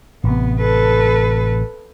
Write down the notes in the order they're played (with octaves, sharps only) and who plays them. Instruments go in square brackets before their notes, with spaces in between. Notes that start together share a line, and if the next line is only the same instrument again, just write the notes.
[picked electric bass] A1 C3 [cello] B3
[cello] A4 B4